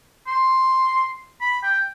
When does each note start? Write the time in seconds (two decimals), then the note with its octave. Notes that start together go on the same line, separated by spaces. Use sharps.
0.27 C6
1.41 B5
1.63 G5